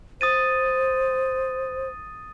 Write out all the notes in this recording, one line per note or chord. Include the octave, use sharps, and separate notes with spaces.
C5 D#6 A6 D#7